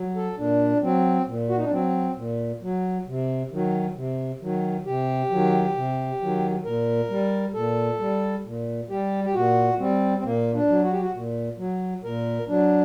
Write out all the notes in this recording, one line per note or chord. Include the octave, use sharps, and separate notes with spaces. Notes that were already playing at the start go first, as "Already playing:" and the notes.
Already playing: F#3
A4
A#2 D4
F#3 C4
A#2
F#4
D#4
D4
F#3 C4
A#2
F#3
C3
D#3 F#3
C3
D#3 F#3
C3 G4
D#3 F#3
C3
D#3 F#3
A#2 A#4
G3
A#2 A4
G3
A#2
G3 G4
G4
A#2 F#4
G3 C4
C4
A#2 A#3
D4
F#3
F#4
G4
F#4
A#2
F#3
A#2 A#4
F#3 D4